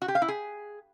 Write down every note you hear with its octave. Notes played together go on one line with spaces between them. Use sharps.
F#4
G4
F5
E4
G#4